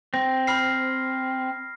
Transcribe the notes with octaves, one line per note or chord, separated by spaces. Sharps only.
C4 A#6
B5 F6 C7